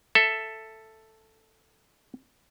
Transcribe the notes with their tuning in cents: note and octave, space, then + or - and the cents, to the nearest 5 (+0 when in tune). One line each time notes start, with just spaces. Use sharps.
A4 +5 E5 +0